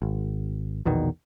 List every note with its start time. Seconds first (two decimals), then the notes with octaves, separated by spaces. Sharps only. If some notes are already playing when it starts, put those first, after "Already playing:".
0.02 G#1
0.85 A#1 E2 B2 D#3